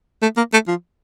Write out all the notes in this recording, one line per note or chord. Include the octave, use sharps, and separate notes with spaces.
A3
A#3
A3
F3